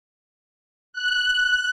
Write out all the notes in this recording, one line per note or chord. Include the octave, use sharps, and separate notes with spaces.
F#6